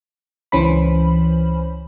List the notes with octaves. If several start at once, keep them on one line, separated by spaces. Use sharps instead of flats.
C#2 E3 C#4 C5 B5